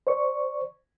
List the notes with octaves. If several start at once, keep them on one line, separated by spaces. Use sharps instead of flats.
C5 D5 C#6